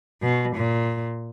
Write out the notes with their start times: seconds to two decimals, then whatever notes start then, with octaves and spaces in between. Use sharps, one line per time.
0.22 B2
0.56 A#2